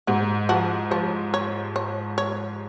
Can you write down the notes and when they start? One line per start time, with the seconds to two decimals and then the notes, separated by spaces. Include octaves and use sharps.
0.07 G#2 F#4
0.49 F3 F#4
0.91 F3 C#5
1.34 C#5
1.76 C#5
2.18 C#5